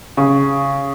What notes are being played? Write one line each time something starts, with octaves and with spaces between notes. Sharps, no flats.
C#3